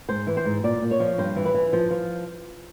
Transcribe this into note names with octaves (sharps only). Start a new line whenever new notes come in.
G#2 C5
E3
C5
G#2
A#2 D5
A#2
C#5
F3
G2 C5
E3
B4
E3
F3 C5
F3